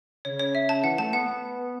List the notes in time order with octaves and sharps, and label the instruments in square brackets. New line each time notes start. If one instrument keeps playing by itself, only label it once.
[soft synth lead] C#3 [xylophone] C#5
[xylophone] C#5
E5
A5
[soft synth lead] E3 [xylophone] F#5
[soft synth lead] A3 [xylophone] A5
[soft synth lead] B3 [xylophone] F#5